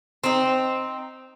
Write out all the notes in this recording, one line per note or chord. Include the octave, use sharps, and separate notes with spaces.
C4 D#4